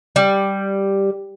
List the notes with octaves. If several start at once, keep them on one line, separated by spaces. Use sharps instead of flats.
G3